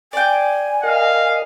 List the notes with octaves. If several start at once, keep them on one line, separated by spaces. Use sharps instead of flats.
D5 G5 G#5
A#4 D#5 F5